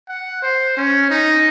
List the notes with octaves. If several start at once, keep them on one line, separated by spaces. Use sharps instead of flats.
F#5
C5
C#4
D#4